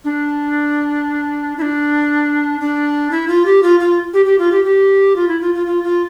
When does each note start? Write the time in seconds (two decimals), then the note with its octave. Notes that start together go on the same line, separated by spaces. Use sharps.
0.05 D4
1.58 E4
1.62 D4
2.60 D4
3.11 E4
3.28 F4
3.46 G4
3.63 F4
3.80 F4
4.14 G4
4.26 G4
4.39 F4
4.52 G4
4.64 G4
5.16 F4
5.28 E4
5.41 F4
5.54 F4
5.67 F4
5.84 F4